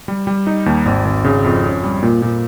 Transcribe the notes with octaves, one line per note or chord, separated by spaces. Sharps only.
G3
G3
D#4
D#2
G#1
G#1
C#3
F2
C#4
G3
A#2
A#2